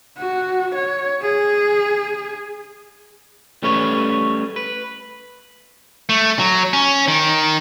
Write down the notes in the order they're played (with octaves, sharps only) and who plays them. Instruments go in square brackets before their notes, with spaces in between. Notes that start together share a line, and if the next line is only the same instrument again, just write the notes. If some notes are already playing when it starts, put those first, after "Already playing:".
[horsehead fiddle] F#4
C#5
G#4
[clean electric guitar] G3 A3 C#4 B4 C#5
B4
[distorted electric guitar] A3
F#3
C#4
D#3